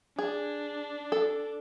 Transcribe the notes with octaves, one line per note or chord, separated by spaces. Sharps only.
D4 G#4
A4